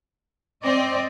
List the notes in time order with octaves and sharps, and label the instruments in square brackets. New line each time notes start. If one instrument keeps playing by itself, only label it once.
[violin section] C4 [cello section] D5 D#5